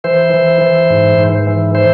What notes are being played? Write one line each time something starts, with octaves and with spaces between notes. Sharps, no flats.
E3 C5
E3
E3
G#2
G#2
E3
E3 C5